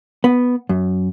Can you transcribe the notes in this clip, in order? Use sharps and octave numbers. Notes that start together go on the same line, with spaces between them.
B3
F#2